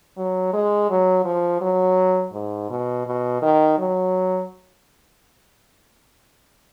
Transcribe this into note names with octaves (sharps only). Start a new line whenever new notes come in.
F#3
G#3
F#3
F3
F#3
G#2
B2
B2
D#3
F#3